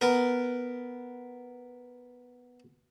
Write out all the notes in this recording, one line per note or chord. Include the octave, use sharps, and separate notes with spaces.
B3 A#4